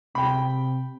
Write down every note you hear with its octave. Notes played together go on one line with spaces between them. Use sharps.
C3 G5 B5